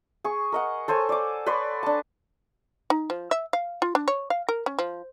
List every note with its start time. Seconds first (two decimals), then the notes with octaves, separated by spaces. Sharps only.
0.24 G#4 C#6
0.52 A#4 D#5 F#5
0.88 A4 C5 C#5 G#5
1.09 D5 D6
1.46 B4 C#5 D5 C6
1.83 D4 A5
2.90 D#4
3.10 F3
3.31 E5
3.53 F5
3.82 F4
3.95 D4
4.08 C#5
4.30 F5
4.49 A#4
4.66 C#4
4.79 F3